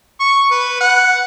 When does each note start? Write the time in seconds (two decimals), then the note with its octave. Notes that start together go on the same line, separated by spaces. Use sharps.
0.20 C#6
0.51 B4
0.81 F#5